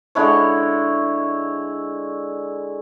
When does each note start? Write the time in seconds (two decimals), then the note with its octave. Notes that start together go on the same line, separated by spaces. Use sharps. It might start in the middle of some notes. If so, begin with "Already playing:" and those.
0.15 D3 G#3 E4 C#5